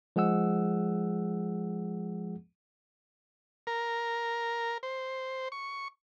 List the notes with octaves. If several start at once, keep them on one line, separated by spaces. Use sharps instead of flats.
F3 G#3 G#4 F#5 E6
A#4
C5
C#6